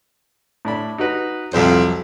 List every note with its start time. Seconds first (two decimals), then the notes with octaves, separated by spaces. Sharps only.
0.65 A2 D4 B5
0.98 D#4 F#4 B4
1.53 C2 F2 F#3 C5